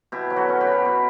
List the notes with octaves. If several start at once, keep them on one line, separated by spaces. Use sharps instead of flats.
B2 E4 G4
F#3
F#4 A4
C#4
G4 B4
B2
B2